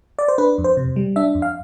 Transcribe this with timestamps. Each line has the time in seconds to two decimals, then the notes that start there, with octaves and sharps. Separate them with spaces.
0.19 D5
0.28 C5
0.38 D4 B4
0.58 F2
0.64 C5
0.77 C3
0.96 G3
1.16 D4 E5
1.35 F2
1.42 F5